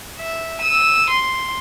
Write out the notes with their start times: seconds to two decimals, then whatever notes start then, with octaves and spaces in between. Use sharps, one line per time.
0.19 E5
0.61 E6 D#7
1.10 C6